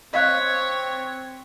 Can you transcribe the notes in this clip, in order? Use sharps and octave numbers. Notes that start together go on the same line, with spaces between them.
C4 C#5 D#5 F5 F#6 B6